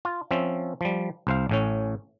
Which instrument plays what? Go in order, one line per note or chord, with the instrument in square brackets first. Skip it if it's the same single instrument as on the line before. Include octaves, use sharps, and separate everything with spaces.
[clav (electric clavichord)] F4
F3 C4 C#4 E5
F3 G3
C2 C5 F5
A1 A2 C#4